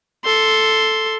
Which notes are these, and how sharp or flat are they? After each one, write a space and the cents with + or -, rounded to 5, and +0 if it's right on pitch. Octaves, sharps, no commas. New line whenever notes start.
A4 +0 C6 +0